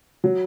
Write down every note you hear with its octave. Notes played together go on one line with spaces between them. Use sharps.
F#3